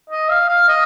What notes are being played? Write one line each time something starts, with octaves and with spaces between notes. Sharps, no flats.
D#5
F5
F5
D#5